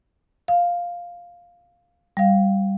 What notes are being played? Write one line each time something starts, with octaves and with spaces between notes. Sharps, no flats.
F5
G3 F5